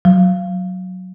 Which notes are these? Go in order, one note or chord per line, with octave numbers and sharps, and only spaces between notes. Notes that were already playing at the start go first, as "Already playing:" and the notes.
F#3